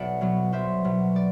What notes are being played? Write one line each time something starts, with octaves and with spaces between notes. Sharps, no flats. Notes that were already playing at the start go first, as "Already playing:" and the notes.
Already playing: B1 D5 E5 F#5
B2 F#3 B3
B1 C5 E5
B2 F#3 B3
D5